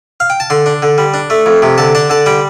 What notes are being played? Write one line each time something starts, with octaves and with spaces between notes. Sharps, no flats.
F5
G5
A5
D3 C6
D4
D3
G3
D4
A3
F2
C3
D3 A5
D4 A5
D3 A5
G3 G5